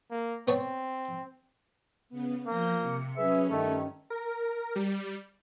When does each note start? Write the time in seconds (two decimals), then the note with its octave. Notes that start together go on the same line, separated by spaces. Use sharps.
0.11 A#3
0.48 B3 C4 C#5 A5
2.09 C#3 B3
2.47 F3 A#3 G6 A#6
2.81 C3 C#7
3.17 F#3 C#4 G#4 B4 E5
3.50 G2 D#3 A3
4.10 A#4
4.76 G3